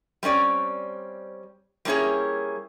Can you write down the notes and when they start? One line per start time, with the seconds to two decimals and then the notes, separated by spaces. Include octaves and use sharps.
0.23 G3 C4 C#4 D5
1.85 G3 A#3 C#4 E4 G#4 C#5